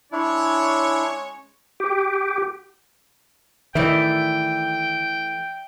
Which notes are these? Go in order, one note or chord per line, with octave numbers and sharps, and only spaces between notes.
G#3 C#4 D4 E4 C#5
G4
D#3 E3 A3 D5 E5 G5